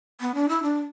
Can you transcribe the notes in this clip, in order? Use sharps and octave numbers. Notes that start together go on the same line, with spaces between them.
B3
D4
E4
D4